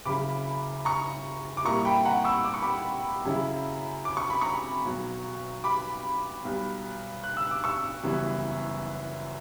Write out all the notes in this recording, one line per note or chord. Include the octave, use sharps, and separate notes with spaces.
F#1 F#2 C#3 B5 D6
A#5 C#6
D6
A#2 G3 A#3 E4 A#5 C#6
G5 B5
F#5 A#5
C#6 E6
D6
C#6
B5 D6
F#2 C#3 F#3 C#4 E4
D6
C#6
B5
A#5 C#6
B1 B2 F#3
B5 D6
B1 B2 G3
F#6
E6
D6
C#6 E6
F#1 F#2 E3 G3 B3